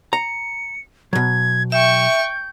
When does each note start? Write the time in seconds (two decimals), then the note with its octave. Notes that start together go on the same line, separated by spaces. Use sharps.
0.13 A#5 C#7
1.13 B2 F#3 G#6
1.72 E5 G5 C#6 G6